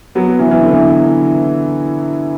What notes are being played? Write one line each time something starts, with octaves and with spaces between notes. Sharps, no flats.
F#3 B3
E3
E3
D3
E3